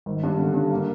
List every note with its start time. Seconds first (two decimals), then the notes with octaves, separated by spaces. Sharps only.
0.06 G#1
0.23 G2
0.39 D3
0.54 G2
0.71 A#3